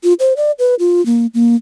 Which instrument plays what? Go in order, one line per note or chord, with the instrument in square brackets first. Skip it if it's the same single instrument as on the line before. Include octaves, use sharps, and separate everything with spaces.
[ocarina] F4
C5
D5
B4
F4
A#3
A#3